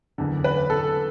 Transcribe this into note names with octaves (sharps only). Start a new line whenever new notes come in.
F#1 E2 D3
B4
A4